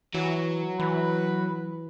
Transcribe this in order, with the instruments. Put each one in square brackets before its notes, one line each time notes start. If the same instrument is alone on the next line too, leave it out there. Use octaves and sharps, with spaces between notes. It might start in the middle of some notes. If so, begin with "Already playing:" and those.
[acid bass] E3 [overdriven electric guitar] F#3
[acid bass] E3 [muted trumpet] B4